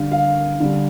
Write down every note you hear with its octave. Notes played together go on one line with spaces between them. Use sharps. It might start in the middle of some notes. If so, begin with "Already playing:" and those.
Already playing: D3 G3 F5
F5
D3 G3